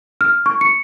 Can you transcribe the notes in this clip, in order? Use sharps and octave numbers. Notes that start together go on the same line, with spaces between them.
F6
C#6
C#7